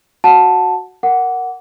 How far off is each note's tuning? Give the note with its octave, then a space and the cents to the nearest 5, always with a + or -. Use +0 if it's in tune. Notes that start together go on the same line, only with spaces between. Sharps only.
F#4 +0 F#5 -15 A5 +0
A#4 +0 F#5 +0 D6 -20